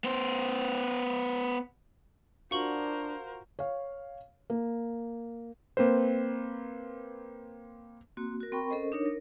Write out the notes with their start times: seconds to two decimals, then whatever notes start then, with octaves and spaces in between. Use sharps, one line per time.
0.04 B3 C5
2.51 D4 F4 F#4 A#4 C5 F#5 C#6 F#7
3.59 C#5 F5
4.50 A#3
5.77 A#3 C4 B4 C5
8.17 A#3 C4 F#4
8.41 F#4 A#4
8.52 C4 A#4 G5 B5 C#6
8.70 C#4 A4 A#4 C5 D#5
8.92 D4 D#4 A#4 C#5
9.06 A#4